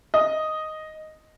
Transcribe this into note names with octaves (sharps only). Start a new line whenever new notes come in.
D#5